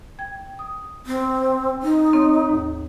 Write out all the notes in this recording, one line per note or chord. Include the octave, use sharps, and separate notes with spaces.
G5 G#6
D#6
C4
D#4
C4 C#5
D#2 G#2